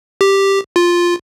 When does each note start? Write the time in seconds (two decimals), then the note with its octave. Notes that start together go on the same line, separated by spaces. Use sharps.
0.21 G4
0.76 F4